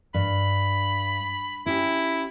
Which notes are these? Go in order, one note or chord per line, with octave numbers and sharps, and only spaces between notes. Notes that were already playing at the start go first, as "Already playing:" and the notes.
G2 B5
C#4 E4 G4